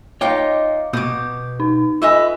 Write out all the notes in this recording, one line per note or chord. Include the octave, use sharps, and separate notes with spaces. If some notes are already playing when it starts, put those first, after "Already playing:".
D#4 F4 C#5 D#5 F5 G5 D6
B2 B3 F#4 D6 D#6 G6
D#4
F4 B4 D#5 E5 G#5